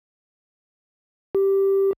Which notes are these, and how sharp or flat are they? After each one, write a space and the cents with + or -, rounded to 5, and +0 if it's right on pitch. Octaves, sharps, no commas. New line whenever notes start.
G4 -5